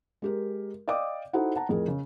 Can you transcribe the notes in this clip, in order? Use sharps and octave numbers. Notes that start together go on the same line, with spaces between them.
G#3 G4 A#4
D5 D#5 F5 G5 D6 D#6
D#4 E4 F#4 A4 C5 F#5
F#5 A5 A#5
F2 A2 G#4 A#4
C#3